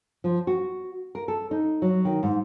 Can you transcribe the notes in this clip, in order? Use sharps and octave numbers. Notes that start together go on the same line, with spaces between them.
F3
F#4
A#4
A4
D#4
F#3
D#3
G#2